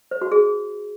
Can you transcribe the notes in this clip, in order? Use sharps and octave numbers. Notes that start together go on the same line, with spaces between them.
C5
F#4
G#4